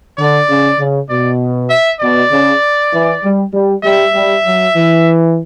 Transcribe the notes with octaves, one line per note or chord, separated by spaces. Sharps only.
D3 D5
C#3
C#3
B2 D5
E5
B2 D5
C#3
E3
G3
G3
G3 E5
G3
F#3
E3